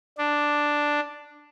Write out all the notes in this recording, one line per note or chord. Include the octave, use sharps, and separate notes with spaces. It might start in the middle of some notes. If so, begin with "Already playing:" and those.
D4